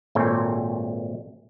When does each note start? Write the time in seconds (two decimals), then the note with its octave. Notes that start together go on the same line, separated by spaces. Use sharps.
0.15 G#1 A#2 A3 C4 C#5 G5